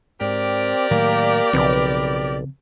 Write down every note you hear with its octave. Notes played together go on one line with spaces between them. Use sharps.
G#2 C4 G4 A#4 D5
A2 D#3 F#3 A#3
B1 C#3 F3 C4 B4